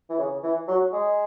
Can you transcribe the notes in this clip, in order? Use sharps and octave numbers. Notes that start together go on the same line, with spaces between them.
E3
C#3
E3
F#3
G#3